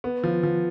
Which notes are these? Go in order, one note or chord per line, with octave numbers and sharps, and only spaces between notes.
B3
F3
F3